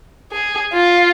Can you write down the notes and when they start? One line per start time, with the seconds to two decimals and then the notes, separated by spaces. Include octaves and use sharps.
0.32 G#4
0.73 F4